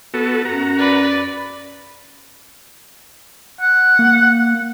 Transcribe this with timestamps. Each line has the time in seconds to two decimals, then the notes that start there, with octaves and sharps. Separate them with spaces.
0.14 B3 F#4 A4
0.45 F#2 F#4 A#5
0.79 B4 D5
3.61 F#5
3.99 A#3